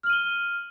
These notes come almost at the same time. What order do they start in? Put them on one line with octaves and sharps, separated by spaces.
F6 F#7 D#7 G7